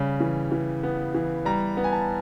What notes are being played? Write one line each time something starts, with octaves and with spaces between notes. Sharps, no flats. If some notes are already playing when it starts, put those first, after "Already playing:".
Already playing: C#3 G3
E3
E3
B3
E3
G3 A#5
B3
G#5
A5